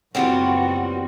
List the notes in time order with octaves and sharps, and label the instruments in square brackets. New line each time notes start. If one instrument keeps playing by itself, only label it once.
[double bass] F#1 [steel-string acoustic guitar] C#3 E3 F4 [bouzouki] G3 B3 C4 [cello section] F#4